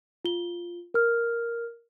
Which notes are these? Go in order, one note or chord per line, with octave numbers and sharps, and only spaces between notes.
F4 G7
A#4 F6